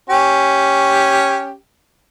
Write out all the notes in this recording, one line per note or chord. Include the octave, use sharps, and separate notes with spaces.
C#4 G4